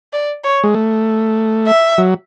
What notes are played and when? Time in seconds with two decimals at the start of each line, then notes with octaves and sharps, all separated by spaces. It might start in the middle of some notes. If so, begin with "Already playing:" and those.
0.13 D5
0.44 C#5
0.64 G#3
0.74 A3
1.67 E5
1.98 F#3